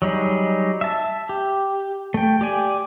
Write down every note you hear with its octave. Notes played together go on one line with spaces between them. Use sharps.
F#3 G3 D#4 G#4
E5 A5
G4
A3 G5
G4 D5 G#5